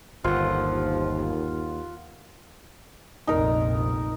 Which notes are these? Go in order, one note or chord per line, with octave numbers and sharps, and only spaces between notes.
G1 D#2 F3 F4 F#5
F1 A#1 F2 D#4 A#4